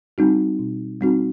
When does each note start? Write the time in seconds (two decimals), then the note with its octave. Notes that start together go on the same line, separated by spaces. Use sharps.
0.18 G3 C4 D#4 F#4
0.59 B2
1.01 G3 C4 D#4 F#4